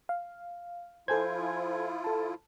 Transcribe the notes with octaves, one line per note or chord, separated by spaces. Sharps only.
F5
F3 E4 F4 A4 C5 G#5 G#6
A4 A5